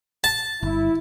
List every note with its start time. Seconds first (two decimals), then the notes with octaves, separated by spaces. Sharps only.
0.24 A5
0.63 G1 E4